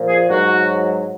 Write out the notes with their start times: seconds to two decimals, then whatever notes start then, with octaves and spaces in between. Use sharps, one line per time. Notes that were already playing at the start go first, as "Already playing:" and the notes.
Already playing: A#2 F3
0.09 G#4
0.29 G#2 F#3 F#4